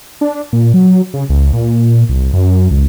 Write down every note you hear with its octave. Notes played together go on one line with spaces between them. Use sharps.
D4
A#2
F#3
C#3
C#2
A#2
C2
F#2
C#2